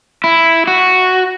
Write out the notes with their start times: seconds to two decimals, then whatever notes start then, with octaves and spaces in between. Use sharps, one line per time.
0.24 E4
0.67 F#4